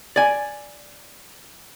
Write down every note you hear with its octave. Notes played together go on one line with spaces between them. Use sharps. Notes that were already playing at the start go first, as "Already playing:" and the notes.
D5 G#5